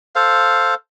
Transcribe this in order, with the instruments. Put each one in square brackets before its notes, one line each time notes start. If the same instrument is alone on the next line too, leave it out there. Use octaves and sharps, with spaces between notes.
[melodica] A4 C5 F5